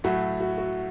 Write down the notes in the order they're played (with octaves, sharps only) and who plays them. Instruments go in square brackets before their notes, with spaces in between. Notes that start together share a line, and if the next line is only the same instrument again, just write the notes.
[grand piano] A2 F#3 A3 [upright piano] F#4
[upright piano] F#4
F#4